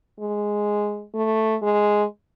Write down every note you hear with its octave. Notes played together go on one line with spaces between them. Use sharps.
G#3
A3
G#3